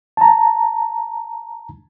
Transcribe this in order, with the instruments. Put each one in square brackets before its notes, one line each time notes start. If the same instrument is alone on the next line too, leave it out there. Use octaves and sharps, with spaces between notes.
[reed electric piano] A5 A#5